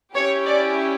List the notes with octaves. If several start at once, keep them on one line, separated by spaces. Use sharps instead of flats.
C#4 E4 G4 C#5
D5